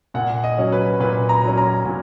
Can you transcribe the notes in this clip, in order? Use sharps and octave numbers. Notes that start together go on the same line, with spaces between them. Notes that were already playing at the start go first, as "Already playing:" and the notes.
A#2 F#5
D#5
F#3 C#4
B4
A#2 B4
A#5
F#3
C#4
A#5
A#2